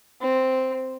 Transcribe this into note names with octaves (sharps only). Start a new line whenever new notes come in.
C4